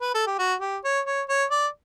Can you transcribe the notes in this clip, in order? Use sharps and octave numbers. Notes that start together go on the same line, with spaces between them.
B4
A4
G4
F#4
G4
C#5
C#5
C#5
D5